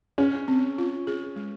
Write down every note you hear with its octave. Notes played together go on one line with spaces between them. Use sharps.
C#4 G#4
C4
F4
G#4
G#3